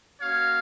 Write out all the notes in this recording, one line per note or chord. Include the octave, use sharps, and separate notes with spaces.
A#3 C#4 F#4 C#5 F5